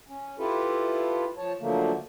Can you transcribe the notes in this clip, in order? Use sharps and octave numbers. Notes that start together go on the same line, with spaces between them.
C#4
E4 F4 G4 A4 B4
F3 C#5 A5
D3 F3 F#3 A3 A#3